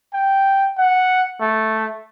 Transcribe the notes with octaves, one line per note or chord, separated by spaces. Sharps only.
G5
F#5
A3